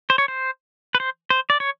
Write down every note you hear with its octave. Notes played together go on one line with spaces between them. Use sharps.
C5
C#5
C5
B4
C5
C5
D5
C#5